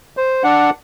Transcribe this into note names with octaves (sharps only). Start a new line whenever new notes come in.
C5
D4 F#5